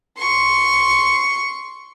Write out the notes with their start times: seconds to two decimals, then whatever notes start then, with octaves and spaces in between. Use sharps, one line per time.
0.18 C6 C#6